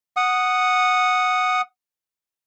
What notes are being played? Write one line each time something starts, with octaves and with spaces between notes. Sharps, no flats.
F#5 D#6